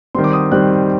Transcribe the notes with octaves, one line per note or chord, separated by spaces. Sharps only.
D#3 G3 C4 C6
D6
D#6
D#3 G3 C4 F#6